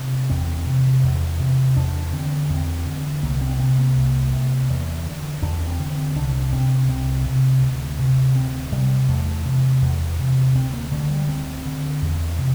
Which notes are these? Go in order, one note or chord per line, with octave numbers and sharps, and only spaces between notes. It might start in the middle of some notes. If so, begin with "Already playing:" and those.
Already playing: C3
E2 C4
C3
E2
C3
E2 D4
D3 C4
E2 C4
D3
C2 A#3
C4
C3 C4
A#3
C2
C3
E2
D3
E2 D4
C4
D3
C4
C2 D4
C3 C4
C2 C4
C3
D2
C3
D2 C4
C3 G3
E2 A3
C3
E2
C3
D2 C4
A#3
D3 A3
G3
D2 C4
D3
E2
C3